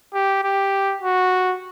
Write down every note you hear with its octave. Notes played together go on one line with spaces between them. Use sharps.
G4
G4
F#4